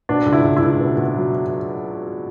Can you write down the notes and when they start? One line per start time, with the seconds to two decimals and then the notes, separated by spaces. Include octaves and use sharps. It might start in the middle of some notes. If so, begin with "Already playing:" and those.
0.09 B2 D4
0.26 C#2
0.33 E4
0.44 C#2
0.57 E4
0.62 C#2
0.81 B2
0.97 B2
1.16 F#3